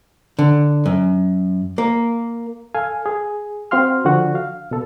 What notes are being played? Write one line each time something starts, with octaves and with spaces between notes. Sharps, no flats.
D3
F#2
A#3
A4 F5 G#5
G#4
C4 F#4 F5 C6 F6
D3 F3 F#4 F#5
F5
B2 A4